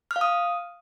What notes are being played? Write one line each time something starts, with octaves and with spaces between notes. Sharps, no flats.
F6
F5
D#6